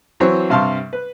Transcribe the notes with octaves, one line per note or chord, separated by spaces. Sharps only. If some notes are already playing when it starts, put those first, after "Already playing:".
E3 F#3 C4 C5 C#5
G2 C3 F5 A5 C6 C#6
B4